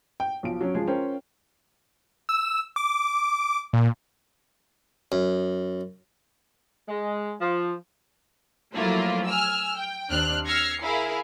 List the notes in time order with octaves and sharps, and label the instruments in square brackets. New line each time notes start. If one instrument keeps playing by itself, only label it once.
[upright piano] G5
B1 F3 D7
F#3 C#4
F3 G#3 G#4
C#4 F4 A#4 C5 G5
[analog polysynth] E6
D6
A#2
[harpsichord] F#2
[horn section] G#3
F3
[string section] F3 F#3 A3 A#3 E4 F4
G#5 E6 F6
G5
D#2 C4 D4 F6 F#6
E6 F6 G#6 A#6 C7 C#7
E4 G#4 A#4 F5